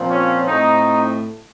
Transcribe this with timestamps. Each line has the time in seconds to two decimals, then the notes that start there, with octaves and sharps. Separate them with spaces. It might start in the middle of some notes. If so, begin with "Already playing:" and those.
Already playing: A#2 F3 C4
0.10 C#4
0.48 A2 A3 C4 D#4